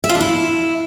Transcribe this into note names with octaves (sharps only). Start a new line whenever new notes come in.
E5
F4
D4
E4